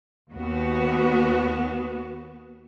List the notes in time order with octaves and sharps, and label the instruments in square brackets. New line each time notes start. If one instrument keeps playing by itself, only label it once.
[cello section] D#2 B3 F#4